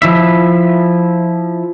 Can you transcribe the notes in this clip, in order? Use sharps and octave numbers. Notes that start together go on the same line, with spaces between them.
F3 E4 E5